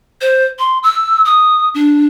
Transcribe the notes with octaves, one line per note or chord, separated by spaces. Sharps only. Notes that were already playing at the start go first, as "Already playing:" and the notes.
C5
C6
E6
D#6
D4